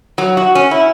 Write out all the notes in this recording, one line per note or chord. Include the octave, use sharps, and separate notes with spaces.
F#3
F#4
C#4
E4